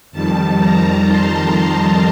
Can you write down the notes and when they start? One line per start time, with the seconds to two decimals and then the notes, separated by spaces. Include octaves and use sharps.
0.12 F2 D#3 G3 A5
0.59 A#5
1.06 C6